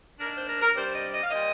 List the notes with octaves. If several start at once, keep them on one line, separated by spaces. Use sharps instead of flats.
D#3 A#3 D4 A#4
C5
A#4
A#4
C3 G3 D4 C5
D#5
D#5
F5
A#2 G3 C4 D#5